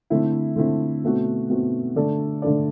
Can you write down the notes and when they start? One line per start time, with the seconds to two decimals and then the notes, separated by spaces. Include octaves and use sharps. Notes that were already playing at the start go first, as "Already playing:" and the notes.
0.10 D3 A3 C4 E4
0.56 D3 A3 C4 E4
1.04 B2 A3 C4 F#4
1.49 B2 A3 C4 F#4
1.96 D3 A3 D4 A4 D5
2.42 D3 A3 D4 A4 D5